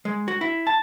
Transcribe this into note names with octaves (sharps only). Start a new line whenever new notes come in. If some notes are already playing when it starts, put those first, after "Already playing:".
G#3
F#4
E4
A5